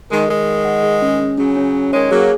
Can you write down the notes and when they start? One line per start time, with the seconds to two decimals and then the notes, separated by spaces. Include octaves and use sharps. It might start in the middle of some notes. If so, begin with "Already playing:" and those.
0.10 D#3 G#3 A#4
0.28 D#3 G#3 A#4
0.47 F#5
0.65 F#5
0.83 G#4
1.02 C#4
1.20 C#4
1.38 C#3 F#3 C#4
1.57 C#4
1.75 C#4
1.93 D#3 G#3 C#5
2.11 F#3 A#3 G#4